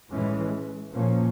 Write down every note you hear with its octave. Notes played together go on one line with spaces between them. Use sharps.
A2 E3 G#3 C#4
A#2 F3 A#3 C#4